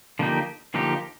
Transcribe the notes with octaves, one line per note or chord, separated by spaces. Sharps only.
D3 F3 A#3 D#4 G4
D3 F3 A#3 D#4 G4